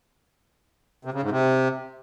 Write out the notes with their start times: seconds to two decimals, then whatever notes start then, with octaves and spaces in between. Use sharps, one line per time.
1.05 C3
1.14 C#3
1.22 G#2
1.31 C3